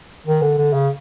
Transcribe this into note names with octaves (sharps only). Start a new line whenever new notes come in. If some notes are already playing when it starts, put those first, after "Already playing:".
D#3
D3
D3
C#3